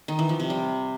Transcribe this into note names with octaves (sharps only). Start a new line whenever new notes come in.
D#3
E3
F3
C3
G3